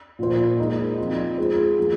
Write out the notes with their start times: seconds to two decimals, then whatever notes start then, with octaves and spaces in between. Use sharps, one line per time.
0.19 A#2 F3 A#3 F4 C5
0.59 G#3 D#4 A#4 D#5
0.98 F3 C4 F4
1.38 G#3 F4 G#4 C5
1.79 F3 A#3 G#4